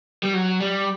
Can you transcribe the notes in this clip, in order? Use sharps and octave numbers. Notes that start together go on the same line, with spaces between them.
G3
F#3
G3